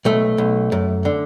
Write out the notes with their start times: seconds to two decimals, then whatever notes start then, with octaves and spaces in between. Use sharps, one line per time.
0.05 B1 A3
0.38 B1
0.72 F#2
1.05 D3